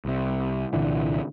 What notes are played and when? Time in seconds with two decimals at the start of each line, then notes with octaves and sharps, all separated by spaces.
0.05 C2 C3
0.73 C2 A#2 D3 E3